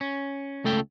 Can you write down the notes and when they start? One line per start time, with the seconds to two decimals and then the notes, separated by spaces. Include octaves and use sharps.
0.01 C#4
0.64 C#2 A3 A4 G5